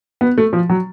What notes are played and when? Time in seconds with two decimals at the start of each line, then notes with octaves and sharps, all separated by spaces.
0.21 B3
0.38 A3
0.53 F3
0.69 F#3